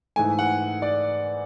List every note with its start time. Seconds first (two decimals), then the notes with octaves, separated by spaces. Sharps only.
0.16 G#2 E3 A3 G#5
0.39 F#5
0.82 D5